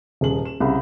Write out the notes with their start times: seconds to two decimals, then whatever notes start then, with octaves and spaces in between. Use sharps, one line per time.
0.21 D#1 G#4 F#7
0.45 E7
0.60 C2 C#3 B5